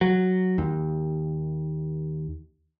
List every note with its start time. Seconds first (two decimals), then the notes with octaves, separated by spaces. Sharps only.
0.01 F#3
0.58 D#2